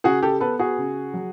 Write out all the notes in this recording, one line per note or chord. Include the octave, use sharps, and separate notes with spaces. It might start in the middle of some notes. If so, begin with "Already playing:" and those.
C#3 F#4 G#4
G4 A4
B3 A4 B4
F#4 G#4
C#3
F#3